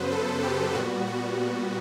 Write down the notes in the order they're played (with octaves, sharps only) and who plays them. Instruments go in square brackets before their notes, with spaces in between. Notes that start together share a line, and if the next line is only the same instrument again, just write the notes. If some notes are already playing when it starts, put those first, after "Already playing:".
Already playing: [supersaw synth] F#2 C#3 F#3 B3 B4 C5
A4
G4
A#2 G3 B3 F#4
F#4
F#4